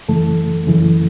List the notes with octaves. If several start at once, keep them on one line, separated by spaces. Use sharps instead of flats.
F#2 C#3 E3 A3 A4
F#2 C#3 E3